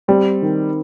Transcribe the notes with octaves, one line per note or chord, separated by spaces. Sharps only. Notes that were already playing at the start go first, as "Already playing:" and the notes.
G3 C4
D#3